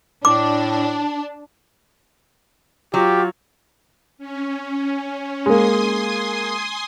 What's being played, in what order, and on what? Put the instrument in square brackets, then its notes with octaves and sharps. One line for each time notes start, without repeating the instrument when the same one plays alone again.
[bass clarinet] A2 [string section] D4 [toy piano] D6
[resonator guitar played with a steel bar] F#3 [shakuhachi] F4 [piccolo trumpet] G4
[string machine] C#4
[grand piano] G#3 A#3 [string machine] G#5 C6 D#6